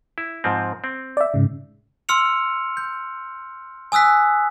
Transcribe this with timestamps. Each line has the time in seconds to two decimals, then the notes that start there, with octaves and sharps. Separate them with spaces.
0.18 E4
0.44 G#2 F3 C4
0.84 C4
1.17 D5 E5
1.34 G#2 C#3
2.09 C6 E6 F6 C#7 F7
2.77 G6
3.92 G#5 D#6 E6 F#6 B6